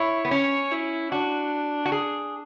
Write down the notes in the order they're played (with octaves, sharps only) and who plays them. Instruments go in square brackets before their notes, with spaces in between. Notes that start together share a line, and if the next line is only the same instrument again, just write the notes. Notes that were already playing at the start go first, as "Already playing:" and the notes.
Already playing: [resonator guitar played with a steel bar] E4 [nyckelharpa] C#5
[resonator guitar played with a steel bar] B3
[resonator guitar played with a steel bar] C#4 [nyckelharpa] C#5
[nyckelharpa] E4
[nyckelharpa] D4 [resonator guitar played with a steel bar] F#4
[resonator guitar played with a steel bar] F#4
G#4